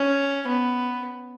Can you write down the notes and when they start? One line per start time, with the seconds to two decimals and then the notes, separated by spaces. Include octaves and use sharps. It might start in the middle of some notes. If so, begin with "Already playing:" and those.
Already playing: C#4
0.48 B3